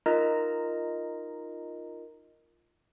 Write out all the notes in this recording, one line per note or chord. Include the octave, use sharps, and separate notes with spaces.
D#4 F4 A#4 D#5 A#5